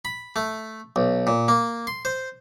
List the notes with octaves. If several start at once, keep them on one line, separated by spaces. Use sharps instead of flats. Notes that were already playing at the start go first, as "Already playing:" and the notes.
B5
A3
B1
A#2
A#3
C6
C5